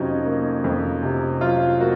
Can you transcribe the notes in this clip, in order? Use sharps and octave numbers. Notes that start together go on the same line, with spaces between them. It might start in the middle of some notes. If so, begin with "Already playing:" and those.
Already playing: F2 C3 F#3 C#4 D#4
A#3
F2
C3
F#3 F4
A#3 F#4